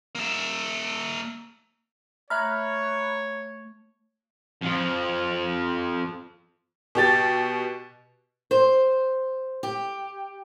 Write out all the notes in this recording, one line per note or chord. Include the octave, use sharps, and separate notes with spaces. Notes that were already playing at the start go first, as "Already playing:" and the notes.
A#3 E5
A3 C#5 E5 A#5 B5 F6 F#6
F2 F3
B2 G4 A6
C5
G4